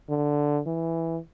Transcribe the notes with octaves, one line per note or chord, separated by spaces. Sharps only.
D3
E3